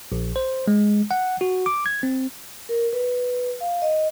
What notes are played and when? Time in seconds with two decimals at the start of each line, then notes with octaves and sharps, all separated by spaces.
0.12 A#1
0.36 C5
0.68 G#3
1.11 F#5
1.41 F#4
1.66 D6
1.86 G#6
2.03 C4
2.69 A#4
2.93 B4
3.61 F5
3.82 D#5